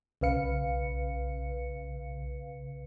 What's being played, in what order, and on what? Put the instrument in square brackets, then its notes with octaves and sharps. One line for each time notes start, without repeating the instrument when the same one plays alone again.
[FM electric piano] B1 C#3 B4 F5 C#7